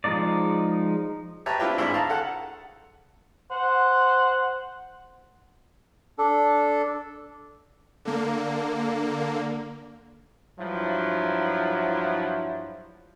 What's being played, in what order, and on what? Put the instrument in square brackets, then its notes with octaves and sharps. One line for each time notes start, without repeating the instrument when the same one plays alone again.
[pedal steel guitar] F3 G#3 D#4 D5
[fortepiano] G4 B4 C#5 E5 A5 A#5
C4 D4 E4 F4 G4 B4
G#1 D3 E4 G#4 C5 B5
F5 A5 A#5
A4 F#5
[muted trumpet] C5 [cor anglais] F#5
[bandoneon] D4 A4
[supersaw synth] D3 A#3
[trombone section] G2 F3 F#3 E4